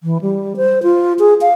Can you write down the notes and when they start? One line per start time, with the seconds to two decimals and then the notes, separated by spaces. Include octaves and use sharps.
0.03 E3
0.21 G3
0.57 C5
0.83 F4
1.19 G#4
1.41 F5